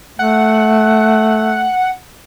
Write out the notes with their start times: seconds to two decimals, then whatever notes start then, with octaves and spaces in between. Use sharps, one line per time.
0.19 A3 F#5